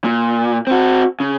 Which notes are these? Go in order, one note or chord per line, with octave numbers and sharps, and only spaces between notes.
A#2
C4 F#4
C#3